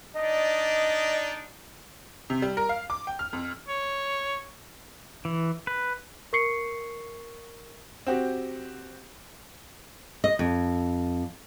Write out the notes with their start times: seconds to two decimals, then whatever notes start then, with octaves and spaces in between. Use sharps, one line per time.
0.15 D4 D#4 D5 D#5
2.30 C3
2.42 G3
2.57 A#4
2.69 F5
2.90 D6
3.07 G5
3.19 F6
3.33 F2
3.68 C#5
5.25 E3
5.67 B4
6.33 A#4 C#6 C7 C#7
8.07 C4 F#4 G4
10.24 D#5
10.39 F2